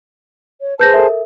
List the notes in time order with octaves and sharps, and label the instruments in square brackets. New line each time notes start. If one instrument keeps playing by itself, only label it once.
[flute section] C#5
[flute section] G#4 C5 A5 [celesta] B4 G6 A#6
[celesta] A4 A#4 E5